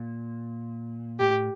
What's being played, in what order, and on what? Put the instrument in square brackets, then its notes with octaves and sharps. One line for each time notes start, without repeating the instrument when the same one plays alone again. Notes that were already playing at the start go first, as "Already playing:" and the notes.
Already playing: [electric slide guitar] A#2
[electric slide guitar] A2 [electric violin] G4